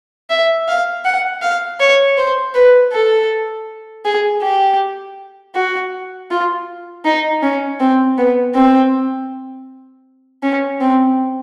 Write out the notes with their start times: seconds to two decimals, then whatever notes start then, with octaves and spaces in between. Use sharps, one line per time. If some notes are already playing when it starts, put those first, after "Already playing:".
0.30 E5
0.68 F5
1.05 F#5
1.42 F5
1.80 C#5
2.17 C5
2.55 B4
2.92 A4
4.05 G#4
4.42 G4
5.55 F#4
6.31 F4
7.05 D#4
7.43 C#4
7.80 C4
8.18 B3
8.55 C4
10.43 C#4
10.81 C4